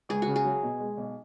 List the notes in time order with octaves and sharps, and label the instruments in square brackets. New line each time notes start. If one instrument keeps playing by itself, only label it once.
[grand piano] C#2 [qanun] G#4
[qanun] F#4
[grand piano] C#3
[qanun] G#4
[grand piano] F#3
B2
G#3
B1